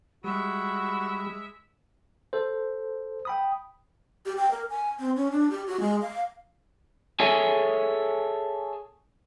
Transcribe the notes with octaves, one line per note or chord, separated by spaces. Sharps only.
G3 G#3 F#4 E5 B5
A4 C5
G5 B5 D#6
G4
G5
A#4
G#5
C4
C#4
D4
G4
F#4
G#3
F5
G#4 A4 C#5 E5 G#5